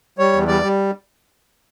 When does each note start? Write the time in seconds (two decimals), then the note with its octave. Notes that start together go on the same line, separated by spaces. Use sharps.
0.18 G3 C#5
0.33 E2
0.48 G3 D5
0.63 G3